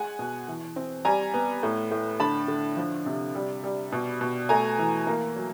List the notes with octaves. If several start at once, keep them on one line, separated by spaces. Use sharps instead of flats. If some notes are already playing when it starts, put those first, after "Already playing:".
Already playing: G#3 F#5 G#5
B2
E3
C4
G3 G#5 A#5
B3
A2
A2
D3 A5 B5
D3
F3
C3
G3
G3
B2
B2
A3 G#5 A#5
E3
A#3
F#3